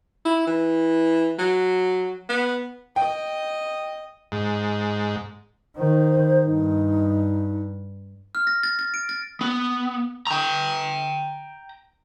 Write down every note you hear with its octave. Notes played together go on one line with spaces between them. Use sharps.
E4
E3
F#3
B3
D#5 G5
G#2
D#3 C5
G2 D#4
F6
A#6
A6
A6
D7
A6
B3
G5 A#5